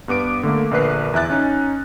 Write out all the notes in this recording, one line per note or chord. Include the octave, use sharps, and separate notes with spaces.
G2 B3 D6 D7
D3 A3 A#3
A#1 D3 A#4 B4 F#6 C7
E2 E5 F#6 A6
C#4 D#4